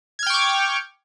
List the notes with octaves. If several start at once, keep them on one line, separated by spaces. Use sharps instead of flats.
G5 C#6 D6 F6 G#6